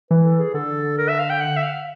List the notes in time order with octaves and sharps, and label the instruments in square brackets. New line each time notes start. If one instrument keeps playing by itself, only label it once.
[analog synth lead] E3 [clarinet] B4
[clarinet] A4
G#4
[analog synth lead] D3 [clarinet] A4
[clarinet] A#4
E5
F5
G5
F#5
E5
F5